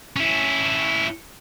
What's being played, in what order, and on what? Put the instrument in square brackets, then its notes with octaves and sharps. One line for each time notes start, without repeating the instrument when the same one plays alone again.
[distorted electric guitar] C#4 E4